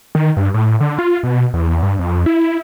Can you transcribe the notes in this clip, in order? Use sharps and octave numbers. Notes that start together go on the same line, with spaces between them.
D#3
G2
A2
D3
F4
B2
E2
G2
F2
E4